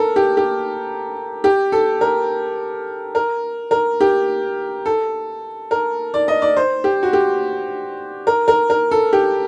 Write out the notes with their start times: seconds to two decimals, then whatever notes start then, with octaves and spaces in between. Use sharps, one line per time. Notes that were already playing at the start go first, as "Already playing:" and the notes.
Already playing: A4 A#4
0.16 G4
0.37 G4
1.44 G4
1.72 A4
2.01 A#4
3.15 A#4
3.71 A#4
4.01 G4
4.86 A4
5.71 A#4
6.14 D5
6.28 D#5
6.42 D5
6.57 C5
6.84 G4
7.03 F#4
7.13 G4
8.27 A#4
8.48 A#4
8.70 A#4
8.91 A4
9.13 G4